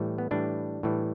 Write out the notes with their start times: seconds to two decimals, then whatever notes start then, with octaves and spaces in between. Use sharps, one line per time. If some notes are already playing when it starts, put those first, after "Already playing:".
Already playing: A2 E3 G3
0.18 B3
0.31 A2 E3 G3 D4
0.83 A2 E3 G3